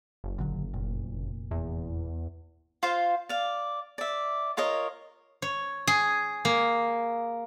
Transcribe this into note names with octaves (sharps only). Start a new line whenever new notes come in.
F#1
A#1 D3 F#3
F1 A#2
E2
F4 C5 F5
D5 F5
D5 E5
F4 A#4 C#5 D#5
C#5
G#4
A#3